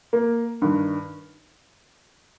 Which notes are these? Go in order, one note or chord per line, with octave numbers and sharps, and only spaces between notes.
A#3
G2 D#3